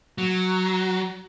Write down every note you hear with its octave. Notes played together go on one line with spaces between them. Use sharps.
F#3